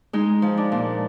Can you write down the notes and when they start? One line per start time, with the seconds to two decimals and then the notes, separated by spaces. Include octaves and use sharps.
0.13 G#3 D#4
0.42 F3
0.57 D4
0.72 A#2